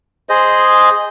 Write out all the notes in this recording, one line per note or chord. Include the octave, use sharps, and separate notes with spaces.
G#4 C5 D#5